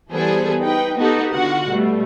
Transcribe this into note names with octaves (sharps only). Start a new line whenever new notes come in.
E3 G3 B3 G#4 A4 C5
D#4 B4 G5
B3 D#4 F#4 G4 A4
D3 F4 F#4 F#5
B2 G3 A3